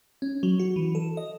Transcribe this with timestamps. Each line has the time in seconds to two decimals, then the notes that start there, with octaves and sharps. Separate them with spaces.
0.22 C#4
0.43 F#3
0.59 F#4
0.76 E3
0.95 A4
1.17 D#5